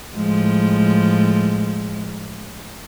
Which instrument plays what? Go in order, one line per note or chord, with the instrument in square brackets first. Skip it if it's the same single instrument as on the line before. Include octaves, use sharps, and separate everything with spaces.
[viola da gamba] A2 F3 G#3